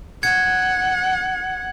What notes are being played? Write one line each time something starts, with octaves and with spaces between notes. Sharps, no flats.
F#5 G#6 C#7